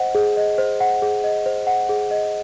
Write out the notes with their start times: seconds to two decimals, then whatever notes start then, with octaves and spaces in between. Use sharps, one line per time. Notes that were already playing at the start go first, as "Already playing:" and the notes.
Already playing: C5 D#5 F#5
0.15 G#4
0.37 D#5
0.58 C5
0.80 F#5
1.02 G#4
1.24 D#5
1.46 C5
1.67 F#5
1.89 G#4
2.11 D#5